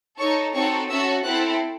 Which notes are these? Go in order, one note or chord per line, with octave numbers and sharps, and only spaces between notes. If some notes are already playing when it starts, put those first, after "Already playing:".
D#4 A4 C#5 C#6
C4 D#4 F#4 A4 C#5 C#6
C#4 F#4 A4 E5 E6
C4 E4 A4 F#5 F#6